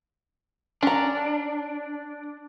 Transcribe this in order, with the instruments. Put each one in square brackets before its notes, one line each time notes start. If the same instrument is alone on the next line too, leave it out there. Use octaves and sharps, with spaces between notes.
[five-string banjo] C#4 A#5 [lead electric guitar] D4